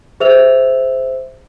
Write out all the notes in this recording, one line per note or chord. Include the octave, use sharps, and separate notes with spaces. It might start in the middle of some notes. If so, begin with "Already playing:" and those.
G#4 C5 E5 E6 F7